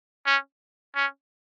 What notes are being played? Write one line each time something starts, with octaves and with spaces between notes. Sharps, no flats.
C#4
C#4